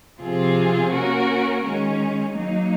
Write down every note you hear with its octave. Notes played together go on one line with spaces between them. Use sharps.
C3 F3 C4 F4 G#4
A#3 C#4 F#4 A#4
D#3 G#3 C#4
F#3 A#3 D#4